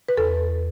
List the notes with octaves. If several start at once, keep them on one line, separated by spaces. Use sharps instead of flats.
B4
E2 A4